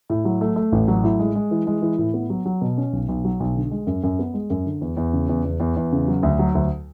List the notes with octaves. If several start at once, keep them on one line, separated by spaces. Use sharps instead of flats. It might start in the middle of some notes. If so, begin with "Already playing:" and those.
A2
F#3
A3
A3
A1
F#3
A2
G#3
G#3
E3
G#3
E3
A2
B3
F#3
F#3
B2
C#4
B1
B1
F#3
B1
D3
G#3
F#2
F#2
B3
G#3
F#2
D3
E2
E2
C#3
E2
E2
E2
E2
C#3
F#3
D2
F#3
D2